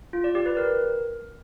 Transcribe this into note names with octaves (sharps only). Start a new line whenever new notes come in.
F4
D5
G4
B4
A#4